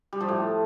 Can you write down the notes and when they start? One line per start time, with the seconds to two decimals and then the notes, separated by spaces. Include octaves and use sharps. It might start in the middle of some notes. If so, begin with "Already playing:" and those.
0.13 G3
0.21 F3
0.28 A2